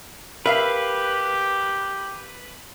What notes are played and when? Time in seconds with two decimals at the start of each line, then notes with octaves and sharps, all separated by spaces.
0.46 G4 A#4 B4 E5 F5